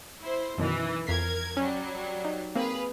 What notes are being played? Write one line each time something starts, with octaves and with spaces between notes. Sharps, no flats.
E4 C5
F#2 B2 D#3 E3
F2 A#4 G#6 B6 C7
F#3 G3 C#4
D#4
A#3 C4 G#4 B4 F5